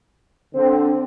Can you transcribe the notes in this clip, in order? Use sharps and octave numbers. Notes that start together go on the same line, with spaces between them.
D3 C4